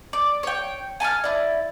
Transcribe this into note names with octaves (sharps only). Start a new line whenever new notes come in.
D5
C#5 G5
G#5 A5 C#6 F6
E4 D5